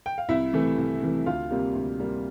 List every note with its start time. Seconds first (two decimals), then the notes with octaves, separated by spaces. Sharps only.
0.06 G5
0.18 F5
0.29 C2 E4 E5
0.53 C3 E3 A3
0.78 C2
1.02 C3 E3 A3
1.26 D2 F4 F5
1.51 C3 G3 A#3
1.75 D2
2.00 C3 G3 A#3